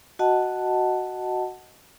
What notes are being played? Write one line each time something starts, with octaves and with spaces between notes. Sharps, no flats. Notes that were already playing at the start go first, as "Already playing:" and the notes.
F#4 D#5 F#5 A5